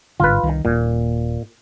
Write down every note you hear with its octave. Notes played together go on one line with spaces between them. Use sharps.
G1 G#2 D3 F4 B4
C2 D#3
D#1 A#2